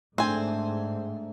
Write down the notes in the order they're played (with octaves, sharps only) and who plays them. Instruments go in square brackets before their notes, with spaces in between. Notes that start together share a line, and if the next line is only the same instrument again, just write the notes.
[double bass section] G#2 [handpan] A3 D4 [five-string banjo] C4 G#5